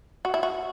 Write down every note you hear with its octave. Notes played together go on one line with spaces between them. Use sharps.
F#4
E4
F#4